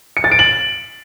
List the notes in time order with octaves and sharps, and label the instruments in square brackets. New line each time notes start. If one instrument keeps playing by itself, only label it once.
[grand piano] C#7
A6
D7
F#7